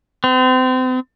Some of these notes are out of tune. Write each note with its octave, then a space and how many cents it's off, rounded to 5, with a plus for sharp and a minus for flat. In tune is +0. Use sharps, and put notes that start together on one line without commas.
C4 -35